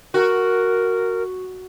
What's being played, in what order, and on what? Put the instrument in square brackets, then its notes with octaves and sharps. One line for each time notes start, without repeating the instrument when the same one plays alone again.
[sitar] F#4 [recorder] A#4